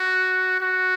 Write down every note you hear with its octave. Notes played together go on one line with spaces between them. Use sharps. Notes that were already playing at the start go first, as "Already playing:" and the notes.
Already playing: F#4
F#4